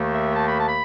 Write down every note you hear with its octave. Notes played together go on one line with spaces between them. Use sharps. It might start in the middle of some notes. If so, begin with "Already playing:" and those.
Already playing: D#2 D#3 A3
E5
A5
B5
A5
B5